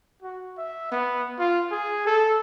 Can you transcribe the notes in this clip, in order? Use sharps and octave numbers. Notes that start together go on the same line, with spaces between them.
F#4
E5
B3
F4
G#4
A4